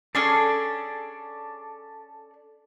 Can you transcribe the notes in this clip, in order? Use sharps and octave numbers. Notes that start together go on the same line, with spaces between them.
C#4 D4 G#4 A4 D5